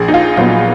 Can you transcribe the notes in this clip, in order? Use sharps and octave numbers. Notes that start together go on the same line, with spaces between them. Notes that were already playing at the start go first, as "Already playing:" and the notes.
Already playing: A#1 G#4
D#4
F4
A#2 F#3 B3 F4